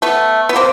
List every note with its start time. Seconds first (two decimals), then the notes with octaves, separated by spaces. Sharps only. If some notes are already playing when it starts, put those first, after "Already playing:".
0.02 A3 B3
0.49 B3
0.56 A#3 C4